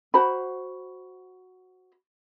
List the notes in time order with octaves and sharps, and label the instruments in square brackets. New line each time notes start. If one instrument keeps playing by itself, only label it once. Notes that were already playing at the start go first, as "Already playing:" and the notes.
[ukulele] F#4 C5 A#5 B5